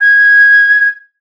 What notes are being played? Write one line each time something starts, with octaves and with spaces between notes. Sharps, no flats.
G#6